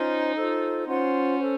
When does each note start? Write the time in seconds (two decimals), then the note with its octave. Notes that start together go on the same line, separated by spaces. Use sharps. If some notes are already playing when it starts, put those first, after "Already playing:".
Already playing: C#4 D#4 F4 C5
0.35 F4 A4 C5
0.87 C#4 F4 C5 F#5 C6
1.40 A4 C5